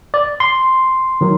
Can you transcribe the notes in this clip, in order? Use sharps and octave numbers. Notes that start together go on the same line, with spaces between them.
D5
C6
D#3 F#3